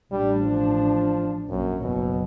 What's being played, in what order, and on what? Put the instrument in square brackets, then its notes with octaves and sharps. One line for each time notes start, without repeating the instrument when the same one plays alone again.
[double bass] A1 D4 [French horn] G3
[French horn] F3
[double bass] A#1 A#2 [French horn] F#2
[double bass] F#1 F#3 [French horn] B2